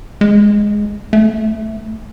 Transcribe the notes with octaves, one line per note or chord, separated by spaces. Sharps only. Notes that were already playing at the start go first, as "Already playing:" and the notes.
G#3
A3